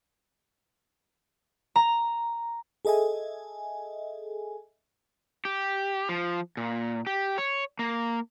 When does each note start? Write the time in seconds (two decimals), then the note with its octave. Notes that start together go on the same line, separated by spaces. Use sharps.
1.76 A#5
2.85 G#4 A4 D#5 E5 G#5
5.45 G4
6.09 F3
6.57 A#2
7.07 G4
7.38 C#5
7.79 A#3